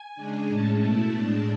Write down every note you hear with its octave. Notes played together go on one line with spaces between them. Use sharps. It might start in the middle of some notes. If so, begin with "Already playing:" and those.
Already playing: G#5
C#3 G#3 D4
A2 G#3 C#4 A5
B2 A3 E4
A2 G#3 D4 A5